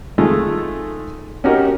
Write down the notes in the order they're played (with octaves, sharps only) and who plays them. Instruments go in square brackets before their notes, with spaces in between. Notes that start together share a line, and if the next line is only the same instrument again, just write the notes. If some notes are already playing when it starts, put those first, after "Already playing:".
[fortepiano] D#3 G#3 A3 F4
C#4 D#4 F#4 G4 A#4